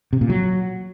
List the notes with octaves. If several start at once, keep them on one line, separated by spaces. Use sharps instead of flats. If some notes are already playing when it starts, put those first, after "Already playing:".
C3
A#2
F#3